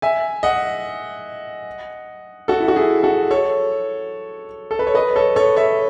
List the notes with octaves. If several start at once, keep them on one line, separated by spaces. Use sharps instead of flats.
E5 G#5
D#5 F#5
F#4 A4
E4
F#4
E4 G#4
F#4 A4
A4 C#5
A4
B4
C#5
B4 D#5
A4 C#5
A4 C#5
C#5 E5